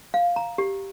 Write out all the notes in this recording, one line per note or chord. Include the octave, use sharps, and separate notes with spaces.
F5
A#5
G4